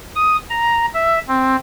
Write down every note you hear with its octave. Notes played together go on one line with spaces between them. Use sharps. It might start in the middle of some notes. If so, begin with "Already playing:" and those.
D#6
A#5
E5
C4